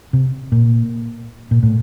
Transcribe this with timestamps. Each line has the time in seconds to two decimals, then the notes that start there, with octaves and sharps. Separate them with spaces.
0.13 C3
0.52 A#2
1.51 A#2
1.63 A2